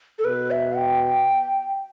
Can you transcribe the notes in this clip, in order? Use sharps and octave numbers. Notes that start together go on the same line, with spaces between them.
A4
B2 B4
E5
G5